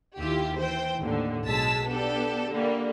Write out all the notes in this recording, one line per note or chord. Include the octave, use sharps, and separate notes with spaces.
D#2 E4 F4 G4
E3 C5 G5
D#2 A2 D3
B1 G#3 G#4 A5 E6 B6
B3 D4 G4 A4
D3 G3 A#3